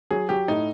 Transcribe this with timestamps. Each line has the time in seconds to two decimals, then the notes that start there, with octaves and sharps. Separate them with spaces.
0.11 F#3 G#4
0.29 F#3 G4
0.48 A2 D#4